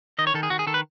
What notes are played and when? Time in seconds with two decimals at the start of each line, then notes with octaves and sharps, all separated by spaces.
0.19 D#3 D#5
0.27 C#5
0.34 D#3 A4
0.43 G#4
0.50 D#3 F#4
0.59 G#4
0.67 D#3 A4
0.74 B4